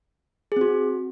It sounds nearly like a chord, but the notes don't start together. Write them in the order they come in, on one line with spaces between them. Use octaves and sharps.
G#4 C4 F#4